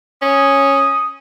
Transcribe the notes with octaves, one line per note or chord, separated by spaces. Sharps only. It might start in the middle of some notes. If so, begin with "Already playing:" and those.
C#4 D#6